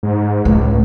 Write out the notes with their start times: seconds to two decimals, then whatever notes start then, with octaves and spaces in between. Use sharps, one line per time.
0.03 G#2
0.45 C#2 A2